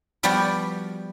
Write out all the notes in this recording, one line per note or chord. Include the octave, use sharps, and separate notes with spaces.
F3 G3 B3 F#4 G4 D5